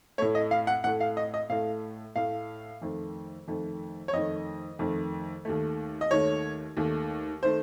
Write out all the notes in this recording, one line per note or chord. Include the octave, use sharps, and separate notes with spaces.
A2 A3 C#5
D#5
F5
F#5
A2 A3 F#5
F5
D#5
D#5
A2 A3 F5
A2 A3 F5
F2 D#3 A3
F2 D#3 A3
C#5
F2 D#3 A3 D#5
F2 D#3 A3
D#2 D#3 A3
D#5
D#2 D#3 A3 C#5
D#2 D#3 A3
D#3 A3 C5